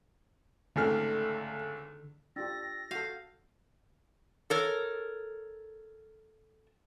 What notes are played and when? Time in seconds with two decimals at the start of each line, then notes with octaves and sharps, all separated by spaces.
0.76 G#1 C#2 D3 A3 F6
2.36 D4 F4 G4 G5 E6 A6 A#6
2.91 F#4 A4 F5 G6
4.50 A4 A#4 C#5